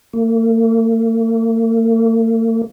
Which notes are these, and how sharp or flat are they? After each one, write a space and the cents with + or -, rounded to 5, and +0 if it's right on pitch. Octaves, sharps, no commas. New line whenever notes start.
A#3 -45